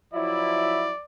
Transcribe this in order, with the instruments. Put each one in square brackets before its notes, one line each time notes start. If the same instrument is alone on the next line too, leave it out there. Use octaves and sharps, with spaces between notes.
[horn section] F3 F#3 E4 [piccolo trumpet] D5